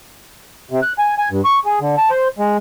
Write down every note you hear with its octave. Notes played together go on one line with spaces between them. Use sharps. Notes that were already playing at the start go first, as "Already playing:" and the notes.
C3
F#6
G#5
G#5
G2
C#6
G#4
D3
A5
C5
G#3